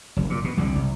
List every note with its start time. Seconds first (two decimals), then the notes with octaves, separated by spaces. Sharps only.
0.17 F#1
0.30 A#2
0.44 B2
0.57 C2 D3
0.76 C2